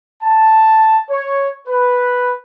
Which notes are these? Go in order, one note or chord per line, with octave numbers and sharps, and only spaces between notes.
A5
C#5
B4